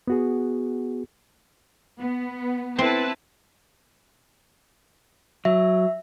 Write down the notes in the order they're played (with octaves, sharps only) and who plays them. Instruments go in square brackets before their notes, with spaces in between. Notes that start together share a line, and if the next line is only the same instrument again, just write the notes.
[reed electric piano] B3 F#4 G#4
[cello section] B3
[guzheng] C4 [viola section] E4 B4 A5
[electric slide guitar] F#3 [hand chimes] E5